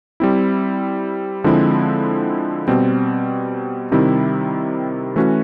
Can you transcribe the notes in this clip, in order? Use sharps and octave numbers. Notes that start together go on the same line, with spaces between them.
G3 C4 E4
D3 F3 G#3 C4 E4
B2 G3 C4
C3 D#3 G3 C4 E4
E3 A3 C#4 F#4